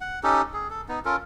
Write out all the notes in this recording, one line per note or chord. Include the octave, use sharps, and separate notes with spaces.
F#5
C#4 D#4 G4 A4
G#4
A4
B3 D#4
C#4 F4 A4 A#4